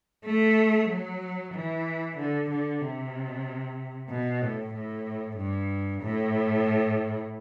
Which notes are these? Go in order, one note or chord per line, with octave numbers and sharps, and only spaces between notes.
A3
F#3
E3
D3
D3
C3
B2
A2
A2
G2
A2